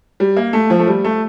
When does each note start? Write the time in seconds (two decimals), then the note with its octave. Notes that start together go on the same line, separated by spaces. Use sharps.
0.20 G3
0.36 A#3
0.53 A3
0.70 F3
0.79 A3
0.87 G3
1.04 A3